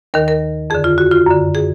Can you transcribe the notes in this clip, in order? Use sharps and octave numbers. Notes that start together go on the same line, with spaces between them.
D#2 D#3 A#4
A#4
F2 D3 G#4
F4
F#4
F4
F#2 D3
G#4